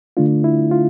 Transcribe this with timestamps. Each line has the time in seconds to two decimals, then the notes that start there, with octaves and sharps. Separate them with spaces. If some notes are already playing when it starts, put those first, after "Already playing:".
0.17 D3 A3 D4 F4
0.44 E4
0.71 F4